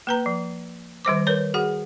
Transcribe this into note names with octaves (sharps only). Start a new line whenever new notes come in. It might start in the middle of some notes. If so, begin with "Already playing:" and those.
A#3 B4 A#5
F3
D#3 G3 C5 D6
A#4 B4 C#5
F#4 G#4 F#5